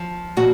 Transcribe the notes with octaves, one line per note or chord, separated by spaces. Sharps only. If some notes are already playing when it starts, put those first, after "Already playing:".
Already playing: F3
A#2 F#4